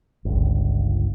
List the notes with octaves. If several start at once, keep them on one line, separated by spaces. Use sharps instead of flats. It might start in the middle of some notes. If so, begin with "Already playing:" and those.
G1 C#2